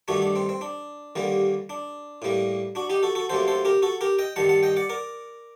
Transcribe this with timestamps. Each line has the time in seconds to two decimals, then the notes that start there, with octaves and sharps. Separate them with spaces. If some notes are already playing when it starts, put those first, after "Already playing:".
0.08 G2 D#3 A3 D4 F#4
0.22 D4
0.36 C4
0.49 C4
0.61 D4
1.16 D#2 D3 G3 A#3
1.70 D4
2.22 A2 G3 A#3
2.75 D4 F#4
2.90 D#4 G4
3.03 F#4 A4
3.15 F#4 A4
3.29 D2 C3 F#3 A#3 A4 C5
3.48 A4 C5
3.65 G4 A#4
3.82 F#4 A4
4.01 G4 A#4
4.19 D#5 G5
4.36 G2 D#3 G3 F#5 A5
4.49 F#5 A5
4.63 D#5 G5
4.77 D5 F#5
4.89 A#4 D5